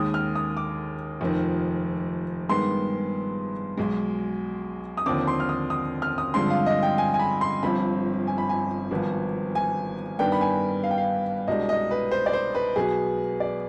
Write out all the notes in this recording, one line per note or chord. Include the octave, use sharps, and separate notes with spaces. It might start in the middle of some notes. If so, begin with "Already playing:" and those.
Already playing: D#2 D#3 G#3 D#6
F6
D#6
D6
F1 F2 D#3
G2 D#3 G#3 B3 C6
B1 B2 G#3
D#6
D#2 D3 F3 C4 D6
C6
F6
D#6
D#6
F6
D#6
G2 D3 F3 G#3 C4 C6
F5
D#5
G5
G#5
G#5
B5
C6
G1 G2 F3 C4 B5
G#5
B5
G#5
G#1 G2 F3 B3
G#5
G2 D#3 B3 D4 G5
B5
G#5
F5
G5
F5
C2 B2 G#3 D4 D#5
D#5
B4
C5
D5
C5
B4
B1 B2 B3 G#4
D5